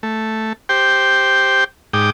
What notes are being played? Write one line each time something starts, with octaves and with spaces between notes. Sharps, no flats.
A3
G4 C5 G5
G#2 G5 D6 D#6